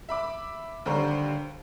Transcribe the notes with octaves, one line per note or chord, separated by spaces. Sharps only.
E5 B5 D6
D#2 D3 G3 C5 A#5 C#6